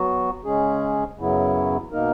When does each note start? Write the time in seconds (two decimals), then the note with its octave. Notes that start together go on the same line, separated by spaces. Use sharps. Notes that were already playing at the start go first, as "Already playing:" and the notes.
Already playing: F#3 B3 F#4
0.45 C#3 G#3 C#4 G#4
1.18 F#2 C#3 F#3 B3 E4
1.92 B2 A#3 D#4 A#4